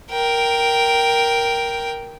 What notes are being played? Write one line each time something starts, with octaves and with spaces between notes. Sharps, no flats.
A#4 G5